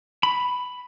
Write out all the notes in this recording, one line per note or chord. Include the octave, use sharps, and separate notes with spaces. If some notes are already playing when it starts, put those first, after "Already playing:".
B5